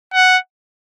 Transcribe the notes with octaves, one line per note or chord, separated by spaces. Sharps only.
F#5